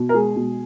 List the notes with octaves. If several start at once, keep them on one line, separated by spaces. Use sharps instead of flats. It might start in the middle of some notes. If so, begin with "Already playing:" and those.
Already playing: B2
A#4
G#3 G#4
B2